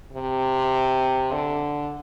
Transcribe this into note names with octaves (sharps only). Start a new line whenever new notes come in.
C3
D3